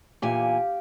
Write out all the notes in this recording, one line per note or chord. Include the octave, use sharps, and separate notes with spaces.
E2 A#2 G4 F5 G#5